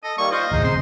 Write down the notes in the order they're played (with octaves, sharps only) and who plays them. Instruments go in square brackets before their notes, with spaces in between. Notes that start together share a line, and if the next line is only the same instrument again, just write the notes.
[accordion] A4 [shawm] D#5
[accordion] D#3 G3 A#3 [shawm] C#6
[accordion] F4 C5 F5 [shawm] D#5
[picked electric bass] A1 D#2 A2 [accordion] G#3 D#4 C5
[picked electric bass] F1 C#3 C4 [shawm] C6